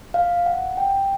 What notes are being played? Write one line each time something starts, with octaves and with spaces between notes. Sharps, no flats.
F5
F#5
G5